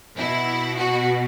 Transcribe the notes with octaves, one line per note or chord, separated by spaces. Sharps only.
B2 E4
F#4